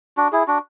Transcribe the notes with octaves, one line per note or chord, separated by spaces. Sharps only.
D4 F#4
E4 G#4
D4 F#4